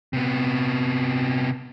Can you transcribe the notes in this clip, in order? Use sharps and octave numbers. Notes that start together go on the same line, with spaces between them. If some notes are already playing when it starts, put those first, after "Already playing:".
C3 B3